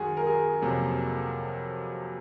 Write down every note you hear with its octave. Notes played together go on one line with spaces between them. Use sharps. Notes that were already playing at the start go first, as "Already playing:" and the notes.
Already playing: F#2 D#3 G#3 F#4 G#4
A#4
G#4
F2 C3 F#3 A#3